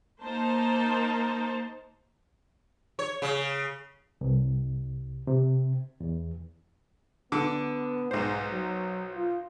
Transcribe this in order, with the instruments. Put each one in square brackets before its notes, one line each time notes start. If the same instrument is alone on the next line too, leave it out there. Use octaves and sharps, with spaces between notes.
[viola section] A#3 D#4 C5 A5
[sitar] C#5
C#3
[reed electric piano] C2
C3
E2
[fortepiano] D3 D6 [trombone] B3
[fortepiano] B1 C5 [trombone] G#2
[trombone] F#3
F4